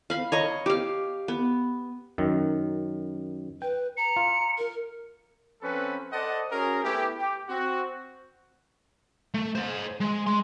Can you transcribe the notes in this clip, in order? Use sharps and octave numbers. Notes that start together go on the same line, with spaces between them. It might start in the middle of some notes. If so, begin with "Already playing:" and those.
F5 B5
C#5 D#5 A#5
G4 F5
B3
F#2 D#3
B4 G5
A#5 C#7
F4
A#4
F3 C4 C#4 A4 B4
A4 C5 D5 D#5 F#5 A5
C#4 F#4 G#4 A#4
A3 B3 E4 G4
G4
C4 F#4
A3
C5 D#5
G#3
G#3 C6